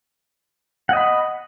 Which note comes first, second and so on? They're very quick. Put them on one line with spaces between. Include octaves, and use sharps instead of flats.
F#5 D#5 B5